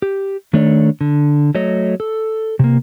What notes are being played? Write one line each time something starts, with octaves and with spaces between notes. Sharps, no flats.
G4
D#3 A3 D4 A4 C#5 D5
D3
F#3 A3 C#5 D#5
A4
C3 A#3